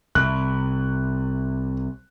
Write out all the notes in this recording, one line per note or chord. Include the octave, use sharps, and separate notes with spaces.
C2 F#6